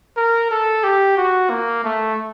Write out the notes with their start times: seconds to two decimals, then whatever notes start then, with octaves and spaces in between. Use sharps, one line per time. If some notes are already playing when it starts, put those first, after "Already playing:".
0.17 A#4
0.51 A4
0.84 G4
1.17 F#4
1.50 A#3
1.84 A3